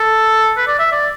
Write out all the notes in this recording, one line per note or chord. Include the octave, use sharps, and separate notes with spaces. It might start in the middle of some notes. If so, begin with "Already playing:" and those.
Already playing: A4
B4
D5
E5
D5